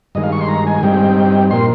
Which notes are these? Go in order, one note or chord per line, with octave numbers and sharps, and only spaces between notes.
G2 D#3 G#3 D#5
F5
C#6
C6
A#5
G#5
G2 G3 C4 D#4 G5
A#2 F3 A#3 C6